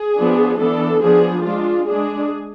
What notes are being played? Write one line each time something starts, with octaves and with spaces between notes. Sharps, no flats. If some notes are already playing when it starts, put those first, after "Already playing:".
Already playing: G#4
F3 B3 D4
E3 B3 D4 A4
F3 B3 D4 G#4
G#3 D4 F4
G#3 D4 G#4